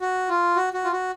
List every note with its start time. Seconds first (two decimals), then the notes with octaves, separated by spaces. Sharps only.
0.01 F#4
0.29 F4
0.56 F#4
0.73 F#4
0.84 F4
0.92 F#4